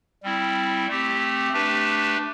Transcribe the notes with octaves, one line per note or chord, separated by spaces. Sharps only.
G3 C4 E4
A3 C4 G4
A3 D4 G4 B4